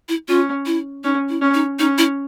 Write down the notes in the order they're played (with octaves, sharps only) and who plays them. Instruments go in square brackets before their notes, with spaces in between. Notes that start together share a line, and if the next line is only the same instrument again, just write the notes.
[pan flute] E4
[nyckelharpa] C#4 [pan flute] F4
[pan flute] E4
[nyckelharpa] C#4 [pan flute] D#4
[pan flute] E4
[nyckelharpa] C#4
[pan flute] D#4
[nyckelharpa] C#4 [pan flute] D#4
[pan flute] E4